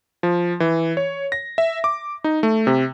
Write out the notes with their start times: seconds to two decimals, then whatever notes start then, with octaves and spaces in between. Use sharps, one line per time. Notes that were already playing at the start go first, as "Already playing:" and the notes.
0.23 F3
0.60 E3
0.97 C#5
1.32 A#6
1.58 E5
1.84 D6
2.24 D#4
2.43 A3
2.67 C3